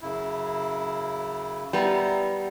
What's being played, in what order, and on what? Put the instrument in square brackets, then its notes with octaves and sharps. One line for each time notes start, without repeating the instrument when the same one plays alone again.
[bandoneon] F#2 C#3 E4
[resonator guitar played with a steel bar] G3 B3 [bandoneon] E4 A#5